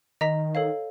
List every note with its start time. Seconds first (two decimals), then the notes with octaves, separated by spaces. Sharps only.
0.21 D#3 D#5 A#5 B6
0.55 A4 C#5 F5